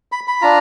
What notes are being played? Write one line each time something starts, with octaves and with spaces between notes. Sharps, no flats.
B5
B5
D4 F4 A#5